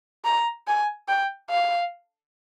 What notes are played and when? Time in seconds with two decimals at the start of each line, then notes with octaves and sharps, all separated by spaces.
0.25 A#5
0.67 G#5
1.08 G5
1.50 F5